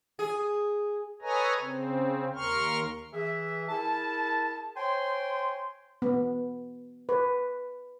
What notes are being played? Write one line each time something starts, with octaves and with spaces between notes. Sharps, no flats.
G#4
A4 B4 C#5 D#5 G#5 A#5
C#3 C4
D#2 A#4 C6 C#6 F6
E3 G#4 E5
E4 G#4 A#4 A5
C5 C#5 G5 G#5 C6
B3
B4